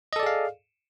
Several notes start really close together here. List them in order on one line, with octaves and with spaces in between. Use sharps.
D#5 A4 D5 G#4 F5